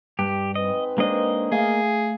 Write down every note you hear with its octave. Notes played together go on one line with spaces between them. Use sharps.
G2 G4
G#2 C4 B4 D#5
G#3 A#3 D4 C5 D#5
A3 G#4 F5